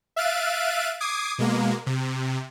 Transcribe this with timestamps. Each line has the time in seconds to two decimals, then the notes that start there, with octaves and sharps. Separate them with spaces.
0.16 E5 F5 F#6 A6 D7 D#7
1.00 D6 D#6 G#6 C7
1.38 B2 G#3 A#3
1.86 C3